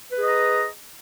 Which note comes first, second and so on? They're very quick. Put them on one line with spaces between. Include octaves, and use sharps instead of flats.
B4 G#4 D#5 A#5